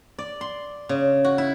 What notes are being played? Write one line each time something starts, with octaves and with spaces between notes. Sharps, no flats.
D5
C6
C#3
F#4
E4